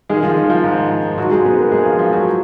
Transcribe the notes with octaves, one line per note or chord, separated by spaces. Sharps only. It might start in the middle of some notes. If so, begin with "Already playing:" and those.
D#3 G#3 G#4
F3 F4
D#3 D#4
F3 F4
G#2
G#2
G#2 F#3 F#4
G#3 G#4
G#2 B3 B4
A#3 A#4
G#2 G#3 G#4
F3 F4
F3 F4
F#3 F#4